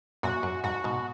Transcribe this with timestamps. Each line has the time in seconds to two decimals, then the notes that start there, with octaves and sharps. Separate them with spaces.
0.23 F#2 A#2 F#4
0.43 F#2
0.64 F2 G#2 F#4
0.84 G#2 B2